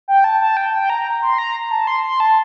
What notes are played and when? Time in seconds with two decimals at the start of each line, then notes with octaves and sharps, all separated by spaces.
0.08 G5
0.24 A5
0.41 A5
0.57 G5
0.74 G5
0.90 A#5
1.22 C6
1.38 A#5
1.71 A5
1.87 C6
2.03 C6
2.20 A5